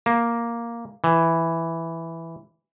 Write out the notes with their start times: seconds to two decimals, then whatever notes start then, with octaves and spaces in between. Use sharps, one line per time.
0.06 A#3
1.04 E3